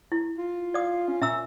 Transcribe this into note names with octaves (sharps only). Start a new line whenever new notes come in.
E4
F4
D5 F5 D#6
C#4
A#2 C#4 E5 A#5 E6